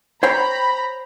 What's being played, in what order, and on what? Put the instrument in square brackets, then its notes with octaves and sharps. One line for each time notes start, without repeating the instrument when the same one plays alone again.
[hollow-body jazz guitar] C5 C#5 G5 [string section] A#5 B5